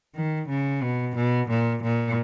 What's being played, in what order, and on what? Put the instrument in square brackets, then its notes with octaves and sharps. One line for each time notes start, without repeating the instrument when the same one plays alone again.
[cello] D#3
C#3
B2
B2
A#2
A#2